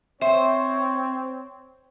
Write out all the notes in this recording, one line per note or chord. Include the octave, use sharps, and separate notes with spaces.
C4 C5 C#5 E5